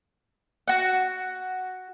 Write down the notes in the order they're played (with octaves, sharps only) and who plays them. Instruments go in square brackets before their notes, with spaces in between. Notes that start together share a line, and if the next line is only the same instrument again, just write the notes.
[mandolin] F#4 F#5